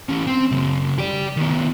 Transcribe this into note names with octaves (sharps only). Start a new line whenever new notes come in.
E3 C#4
C4
C#3 F#3
G4 D5
D#3 B3